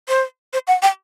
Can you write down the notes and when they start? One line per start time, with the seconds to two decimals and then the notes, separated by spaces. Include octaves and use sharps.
0.08 C5
0.53 C5
0.67 F#5
0.82 G5